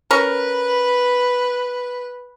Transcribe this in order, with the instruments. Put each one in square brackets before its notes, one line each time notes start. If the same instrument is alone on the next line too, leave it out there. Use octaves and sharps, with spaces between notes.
[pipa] C#4 A#4 [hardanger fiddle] B4